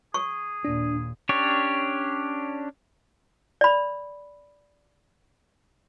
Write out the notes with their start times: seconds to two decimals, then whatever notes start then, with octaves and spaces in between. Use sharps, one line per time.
0.14 G#4 C#6
0.65 D#2 A#2 D4
1.29 C#4 D4 G4 C#5
3.61 D5 B5